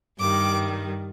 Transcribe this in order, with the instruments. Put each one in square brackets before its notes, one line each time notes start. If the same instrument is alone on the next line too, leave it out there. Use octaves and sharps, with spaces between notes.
[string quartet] G2 D#3 G3 D6